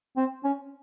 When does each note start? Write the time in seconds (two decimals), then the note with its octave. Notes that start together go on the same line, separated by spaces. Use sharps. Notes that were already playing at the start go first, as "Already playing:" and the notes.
0.17 C4
0.44 C#4